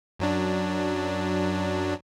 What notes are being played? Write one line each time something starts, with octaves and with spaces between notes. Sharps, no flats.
F#2 F#3 D4